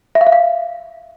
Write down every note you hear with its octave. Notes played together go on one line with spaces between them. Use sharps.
E5
F5
E5
F5